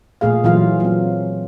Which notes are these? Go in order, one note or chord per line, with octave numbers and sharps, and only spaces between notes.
A#2 A3 G#4 F5
A#2 E3 F#3 F4 F5
F#3 C4